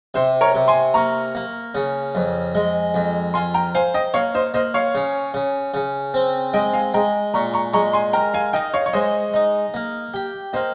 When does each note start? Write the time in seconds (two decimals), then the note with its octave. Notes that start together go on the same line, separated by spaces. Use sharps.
0.14 C3 C5
0.41 A#4 C#5
0.55 C3
0.68 G#5 C6
0.94 A#3 A#5 C#6
1.35 A#3
1.75 C#3
2.15 F2
2.55 G#3
2.94 F2
3.34 F4 G#5 C6
3.54 G5 A#5
3.75 C5 F5 G#5
3.94 D#5 G5
4.14 A#3 C#5 F5
4.35 C5 D#5
4.54 A#3 C5 D#5
4.74 C#5 F5
4.95 C#3
5.34 C#3
5.74 C#3
6.14 C4
6.54 G#3 D#5 G5
6.73 F5 G#5
6.94 G#3 G5 A#5
7.34 A#2 A#5 C#6
7.54 A#5 C#6
7.73 G#3 A#5 C#6
7.93 G#5 C6
8.13 A#4 G5 A#5
8.34 F5 G#5
8.53 D#4 D#5 G5
8.74 C#5 F5
8.86 C#5
8.93 G#3 C5 D#5
9.34 D#4
9.74 A#3
10.14 G4
10.53 A#3 C5 D#5